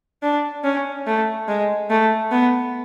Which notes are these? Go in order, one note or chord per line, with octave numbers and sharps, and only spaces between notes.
D4
C#4
A3
G#3
A3
B3